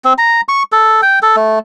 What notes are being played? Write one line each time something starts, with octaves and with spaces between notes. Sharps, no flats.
C4
A#5
C#6
A4
G5
A4
A3